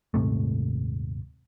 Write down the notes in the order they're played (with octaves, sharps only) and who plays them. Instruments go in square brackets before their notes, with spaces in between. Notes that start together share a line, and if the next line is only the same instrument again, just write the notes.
[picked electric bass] D#1 G#2 C3 A3